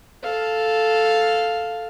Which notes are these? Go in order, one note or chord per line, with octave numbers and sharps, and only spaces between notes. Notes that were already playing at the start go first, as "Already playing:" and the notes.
A4 F5